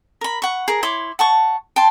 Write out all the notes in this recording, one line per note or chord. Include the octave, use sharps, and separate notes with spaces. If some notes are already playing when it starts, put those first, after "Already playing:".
A#4 B5
F#5 C#6
G#4 A#4
E4 C#5 C6 D6
F#5 A5 C#6
G5 A5 C6